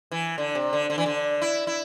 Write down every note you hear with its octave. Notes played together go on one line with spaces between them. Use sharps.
E3
D3
C3
D3
D3
E3
D3
E4
E4